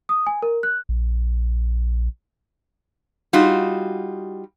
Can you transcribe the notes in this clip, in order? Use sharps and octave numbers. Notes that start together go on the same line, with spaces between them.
D#6
G#5
A#4
F#6
A#1
G3 D#4 F4 F#4